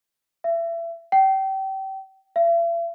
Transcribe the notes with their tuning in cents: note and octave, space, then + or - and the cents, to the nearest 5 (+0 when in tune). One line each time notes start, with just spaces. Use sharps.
E5 +30
G5 -30
E5 +45